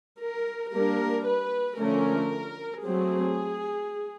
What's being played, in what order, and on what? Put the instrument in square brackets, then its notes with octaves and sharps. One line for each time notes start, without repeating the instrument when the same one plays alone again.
[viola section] A#4
G3 A#3 D4 A#4
B4
D3 F3 A3 C#4 A#4
F#3 A3 C4 G#4